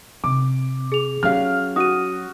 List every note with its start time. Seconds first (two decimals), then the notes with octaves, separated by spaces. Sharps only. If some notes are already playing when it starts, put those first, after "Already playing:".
0.24 C3 D6
0.92 G#4 F7
1.23 F#3 C#4 G4 F5 F6
1.76 F#4 D#6 D#7